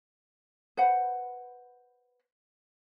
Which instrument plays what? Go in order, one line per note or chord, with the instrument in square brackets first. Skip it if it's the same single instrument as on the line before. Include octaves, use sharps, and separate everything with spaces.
[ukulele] B4 C5 F#5